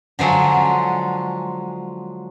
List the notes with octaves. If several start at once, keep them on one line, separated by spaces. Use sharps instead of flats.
D3 F3 F#3 G#3